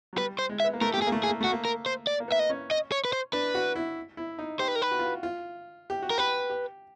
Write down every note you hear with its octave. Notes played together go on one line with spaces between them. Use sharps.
F#3
G3 B4
C5
G#3
E5
B3
A#3
A3 A#4
G4
A3 G#4
A#3
A3
G#4
A#3
A3 F#4
A#3
A#4
C5
D5
A#3
B3 E5
D#5
C#4
D#5
C#5
B4
C5
D4 B4
F#4
E4
E4
D#4
G4 C5
B4
A#4
B4
F#4
F4
F#4
F4
G4
F#4
A#4
G4 B4
G4